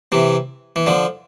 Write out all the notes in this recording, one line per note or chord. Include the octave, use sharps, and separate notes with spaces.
C3 E3
E3
D3 F3